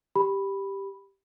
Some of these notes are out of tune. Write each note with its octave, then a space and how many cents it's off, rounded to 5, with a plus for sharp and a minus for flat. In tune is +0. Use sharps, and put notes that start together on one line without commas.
G4 +0 B5 +0